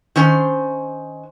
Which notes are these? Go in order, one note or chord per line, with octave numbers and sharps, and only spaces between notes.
D#3 C#4 C5